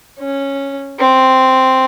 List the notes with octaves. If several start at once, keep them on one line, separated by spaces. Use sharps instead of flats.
C#4
C4